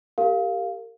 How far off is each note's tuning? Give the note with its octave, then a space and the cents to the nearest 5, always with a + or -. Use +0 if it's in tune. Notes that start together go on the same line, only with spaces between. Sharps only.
G4 +0 A#4 -30 F5 +0